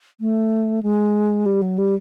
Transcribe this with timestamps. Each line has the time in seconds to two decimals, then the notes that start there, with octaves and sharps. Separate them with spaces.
0.20 A3
0.83 G#3
1.46 G3
1.62 F#3
1.78 G3